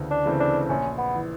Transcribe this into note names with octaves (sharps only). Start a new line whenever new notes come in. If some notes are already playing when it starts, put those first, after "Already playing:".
Already playing: D2 C#3 E3 A3 C4
D4
C#3 E3 A3 C4
D4
A#1 C#4
B3
E3